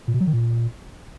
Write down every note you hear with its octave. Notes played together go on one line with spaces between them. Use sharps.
A#2
B2
F#3
D#3
A#2